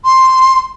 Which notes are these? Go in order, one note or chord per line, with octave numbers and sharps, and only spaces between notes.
C6